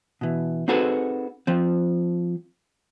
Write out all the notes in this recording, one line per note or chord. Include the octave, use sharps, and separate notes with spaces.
B2 E3
C4 D#4 F#4 G#4 A4 B4
F3 C4